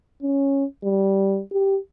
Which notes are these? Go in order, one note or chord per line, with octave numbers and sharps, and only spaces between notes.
C#4
G3
G4